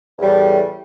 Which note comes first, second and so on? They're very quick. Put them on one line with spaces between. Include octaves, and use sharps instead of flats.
E2 G3 A2